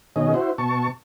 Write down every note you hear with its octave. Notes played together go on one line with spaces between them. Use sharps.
B2 D#3 C#4 G#4 D#5
E4 F#4 C5
B2 A5 C#6